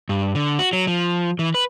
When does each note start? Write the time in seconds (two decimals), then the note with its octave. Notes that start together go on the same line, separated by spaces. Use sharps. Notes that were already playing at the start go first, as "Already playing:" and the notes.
0.09 G2
0.35 D3
0.59 F#4
0.73 F#3
0.87 F3
1.39 E3
1.54 B4